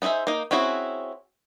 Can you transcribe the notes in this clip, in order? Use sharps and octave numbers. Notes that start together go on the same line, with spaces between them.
B3 D#4 G#4 C5 E5
A#3 D#4
C4 C#4 E4 F#4 G#4